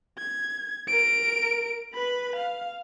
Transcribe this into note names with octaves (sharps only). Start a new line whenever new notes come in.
G#6
A#4 D7
B4 B5
F5